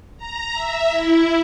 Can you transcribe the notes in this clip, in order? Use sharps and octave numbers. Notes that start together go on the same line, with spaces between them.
A#5
E5
E4